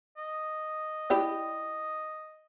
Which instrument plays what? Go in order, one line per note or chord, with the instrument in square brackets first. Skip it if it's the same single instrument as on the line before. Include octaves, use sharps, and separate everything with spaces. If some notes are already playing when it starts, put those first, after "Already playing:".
[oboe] D#5
[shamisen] E4 G4 D5